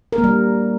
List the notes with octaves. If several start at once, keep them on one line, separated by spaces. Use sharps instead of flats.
A#4
A#3
G3